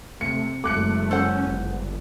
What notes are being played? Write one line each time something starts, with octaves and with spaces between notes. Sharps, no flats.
C3 A3 C#7
F#1 G#3 A3 D6 F#6 C#7
C#4 A4 C5 F#5
G1